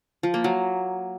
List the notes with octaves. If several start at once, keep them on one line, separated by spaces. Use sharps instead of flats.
F3
A#3
F#3